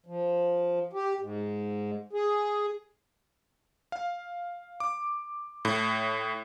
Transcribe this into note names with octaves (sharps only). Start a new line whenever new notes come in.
F3
G4
G#2
G#4
F5
D6
A2